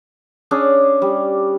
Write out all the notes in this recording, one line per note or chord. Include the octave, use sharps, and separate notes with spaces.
C#4 D4 G#4
G3